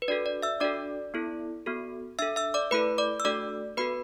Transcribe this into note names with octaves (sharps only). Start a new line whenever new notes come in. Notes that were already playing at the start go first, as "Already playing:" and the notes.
B4
D4 F#4 A4 D5
D5
E5 E6
D4 F#4 A4 D5 D6
B3 E4 A4
B3 F#4 A4
D4 A4 E5 E6
E5 E6
D5 D6
A3 E4 A4 B4 B5
D5 D6
E6
A3 D4 F#4 A4 D5 D6
B3 F#4 A4 B4 B5